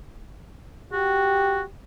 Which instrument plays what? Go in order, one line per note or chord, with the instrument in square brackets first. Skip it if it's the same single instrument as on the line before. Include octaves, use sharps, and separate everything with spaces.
[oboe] F#4 [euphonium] G4